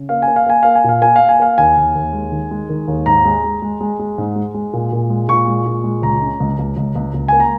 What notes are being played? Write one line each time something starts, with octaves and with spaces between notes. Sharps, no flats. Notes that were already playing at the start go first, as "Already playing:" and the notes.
Already playing: C#3
A#3 F5
G#5
A#3
F5
A#3 G#5
A#3 F5
G#5
A#2 F5
A#3 G#5
A#3 F5
G#5
A#3 F5
D#2 G#5
D#2
D#2
G#3
D#3
G#3
D#3
D#2
G#2 A#5
G#3
G#3
G#3
G#3
G#3
G#2
G#3
G#3
A#2
A#2
G#3
A#2 C#6
G#3
A#2
G#3
C#2 A#5
C#3
C#2
C#2
C#2
C#2
C#2
A#3 G#5
A#5